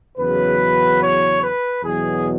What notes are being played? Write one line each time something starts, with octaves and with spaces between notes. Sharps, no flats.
E2 C#3 F#3 B4
C#5
B4
E2 B2 F#3 G#4